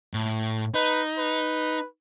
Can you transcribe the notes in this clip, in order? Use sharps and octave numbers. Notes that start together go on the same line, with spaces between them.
A2
D#4 B4
B4